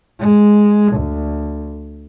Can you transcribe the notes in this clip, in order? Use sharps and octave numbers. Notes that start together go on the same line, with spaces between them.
G#3
D2